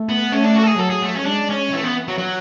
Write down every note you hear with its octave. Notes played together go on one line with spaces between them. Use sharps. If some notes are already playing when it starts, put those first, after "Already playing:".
Already playing: A3
B3
A3 C#4
D4
F#4
A4
G#4
F#3 A4
G#4
A3
C#4
G#3 D4
C#4
E3 A3
B3
F#3
F#3